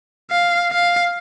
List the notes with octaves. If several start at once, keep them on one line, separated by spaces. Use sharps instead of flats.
F5
F5